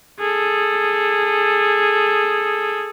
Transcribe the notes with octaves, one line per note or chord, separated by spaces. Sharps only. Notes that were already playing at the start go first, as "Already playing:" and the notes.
G#4 A4